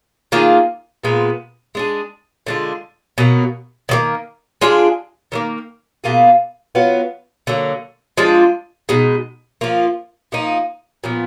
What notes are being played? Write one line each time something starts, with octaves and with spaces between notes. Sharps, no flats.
D#3 A#3 F4 G#4
A#2 G#3 B3 F4
G#3 D4 G#4
D3 G#3 D4 F4
B2 F#3 A#3
D#3 F#3 A#3
G#3 D4 F4 G#4
D#3 F#3 A#3
B2 A#3 F4 G#4
F#3 B3 F4
D3 F#3 A#3
F3 G#3 D4 F4
B2 G#3 D#4
F3 A#3 F4
F3 A#3 D#4
A#2 F3 B3